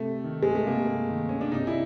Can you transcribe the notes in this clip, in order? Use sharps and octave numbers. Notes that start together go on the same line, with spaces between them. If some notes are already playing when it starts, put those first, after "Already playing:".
Already playing: C3 A3
D#3
G#3
A3
C3 A#3
D#3
C#4
D4
C3 D#4
E4